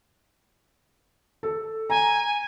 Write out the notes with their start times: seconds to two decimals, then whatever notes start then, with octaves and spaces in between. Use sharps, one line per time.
1.43 A4
1.90 G#5 A#5